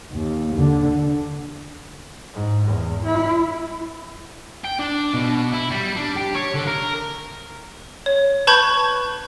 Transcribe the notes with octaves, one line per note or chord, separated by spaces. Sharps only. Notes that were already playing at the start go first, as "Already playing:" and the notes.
D#2
D3
G#2
E2
E4
G5
D4
B2
E4
G3
D4
G4
C#5
D3
A#4
C#5
B4 A5 B5 C#6 G6 G#6